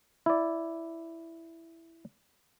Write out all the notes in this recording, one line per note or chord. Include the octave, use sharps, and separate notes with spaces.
E4 D5